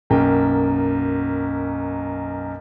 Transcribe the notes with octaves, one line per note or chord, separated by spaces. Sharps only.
B1 F#2 A#3 G5